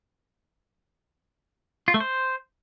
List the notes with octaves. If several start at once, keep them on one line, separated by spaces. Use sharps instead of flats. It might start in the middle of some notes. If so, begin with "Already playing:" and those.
F4
A3
C5